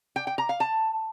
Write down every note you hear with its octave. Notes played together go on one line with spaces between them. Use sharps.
G5
G5
A#5
F5
A5